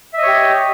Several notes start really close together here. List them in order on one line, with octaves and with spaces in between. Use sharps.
E5 D#5 C#5 G4